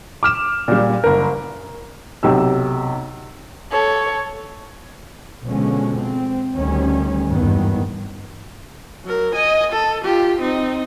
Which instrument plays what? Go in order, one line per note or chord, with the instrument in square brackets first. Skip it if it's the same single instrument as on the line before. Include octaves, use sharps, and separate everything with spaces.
[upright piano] D6 F6 E7
A#2 G3
F#1 A#4
B1 C3 G4 E6
[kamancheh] A4 C#5
[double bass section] B2 D3 F3 G#3 C#4
C4
D2 D#3 G3 C#4
G#1 E2 G2 B2 D#3 B3
[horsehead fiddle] F#3 A#4
D#5 G#5
A4
F4 G4
C4 D#4